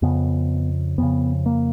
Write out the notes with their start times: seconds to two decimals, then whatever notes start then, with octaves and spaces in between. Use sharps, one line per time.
0.02 F2 C#3 B3
0.98 F2 C#3 B3
1.46 A#3